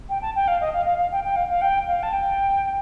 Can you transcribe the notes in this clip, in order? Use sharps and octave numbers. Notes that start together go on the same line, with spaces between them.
G5
A5
G5
F5
D#5
F5
F5
F5
G5
G5
F5
F5
G5
F5
A5
G5